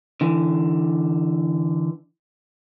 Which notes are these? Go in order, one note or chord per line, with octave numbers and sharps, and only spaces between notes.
D3 E3